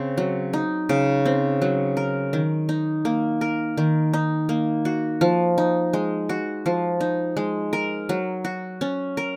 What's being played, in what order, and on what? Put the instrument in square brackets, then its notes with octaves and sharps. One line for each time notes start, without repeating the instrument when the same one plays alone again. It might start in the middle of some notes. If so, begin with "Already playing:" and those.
Already playing: [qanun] C#3 C4
F#3
D#4
C#3
C4
F#3
A#4
D#3
D#4
A#3
A#4
D#3
D#4
A#3
F#4
F3
D#4
G#3
F#4
F3
D#4
G#3
A#4
F#3
F#4
C#4
A#4